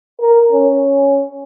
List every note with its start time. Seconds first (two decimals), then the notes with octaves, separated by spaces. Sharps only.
0.21 A#4
0.52 C#4